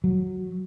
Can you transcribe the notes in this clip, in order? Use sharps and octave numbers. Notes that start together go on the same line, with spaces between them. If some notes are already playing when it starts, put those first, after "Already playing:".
F#3